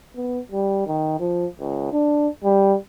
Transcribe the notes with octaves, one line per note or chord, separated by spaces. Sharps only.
B3
G3
D#3
F3
C#2
D4
G3